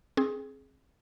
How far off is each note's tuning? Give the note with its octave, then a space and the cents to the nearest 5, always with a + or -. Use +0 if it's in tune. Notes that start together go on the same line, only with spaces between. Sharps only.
C4 +25 G#4 +15